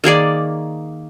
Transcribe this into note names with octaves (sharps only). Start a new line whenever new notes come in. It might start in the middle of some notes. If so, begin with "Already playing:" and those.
D#3 A#3 G#4 D5